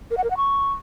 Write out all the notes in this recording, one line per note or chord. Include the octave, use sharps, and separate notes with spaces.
A#4
F#5
A#4
F#5
C#6